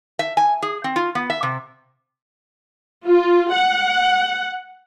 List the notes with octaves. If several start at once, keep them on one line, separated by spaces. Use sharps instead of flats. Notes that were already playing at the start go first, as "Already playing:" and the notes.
E5
G#5
G#4
C4
F4
B3
E5
C3
F4
F#5